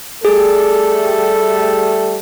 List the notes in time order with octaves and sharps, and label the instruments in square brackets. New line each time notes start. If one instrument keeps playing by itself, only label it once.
[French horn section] G3 A3 A4 [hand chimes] G#4